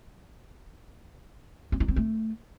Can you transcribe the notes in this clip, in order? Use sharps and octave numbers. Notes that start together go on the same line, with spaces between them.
C#4
D#4
C4
A3